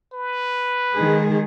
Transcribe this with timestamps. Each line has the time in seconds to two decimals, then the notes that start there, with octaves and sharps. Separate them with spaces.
0.13 B4
0.94 D#3 G#3 G#4